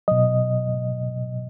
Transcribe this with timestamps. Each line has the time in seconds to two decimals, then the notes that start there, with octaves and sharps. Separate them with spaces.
0.08 B2 F#3 D#5